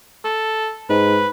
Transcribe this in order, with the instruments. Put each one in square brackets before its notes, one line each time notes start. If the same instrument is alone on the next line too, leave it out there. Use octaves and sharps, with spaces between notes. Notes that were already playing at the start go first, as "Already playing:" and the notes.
[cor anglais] A4
[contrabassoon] G#2 [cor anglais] B4